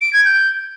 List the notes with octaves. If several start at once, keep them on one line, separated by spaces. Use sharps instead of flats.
D7
G#6
G6